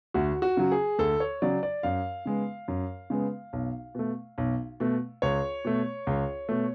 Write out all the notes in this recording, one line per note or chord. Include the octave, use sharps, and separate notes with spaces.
D2 F#4
F#4
C#3 F#3
G#4
D2 A4
C#5
C#3 F#3 D5
D5
F#2 F5
C#3 G#3 B3
F#2
C#3 G#3 B3
B1
B2 A3
B1
B2 A3
C#2 C#5
B2 A3
C#2
B2 A3